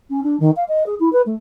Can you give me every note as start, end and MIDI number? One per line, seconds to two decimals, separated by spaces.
0.10 0.20 61
0.23 0.37 62
0.39 0.50 51
0.56 0.63 77
0.68 0.83 75
0.86 0.94 68
0.99 1.11 64
1.12 1.21 71
1.26 1.35 57